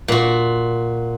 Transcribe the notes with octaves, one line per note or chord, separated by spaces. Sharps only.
A#2 F#4